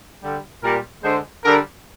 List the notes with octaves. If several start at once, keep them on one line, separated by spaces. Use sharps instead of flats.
D3 G3
A#2 G3 A#4
D3 G#3 C5
D3 G3 A#4